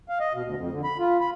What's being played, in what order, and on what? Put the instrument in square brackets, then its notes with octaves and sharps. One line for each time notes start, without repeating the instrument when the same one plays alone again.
[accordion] F5
D#5
B2
D2
F2
D3
B5
F4
B5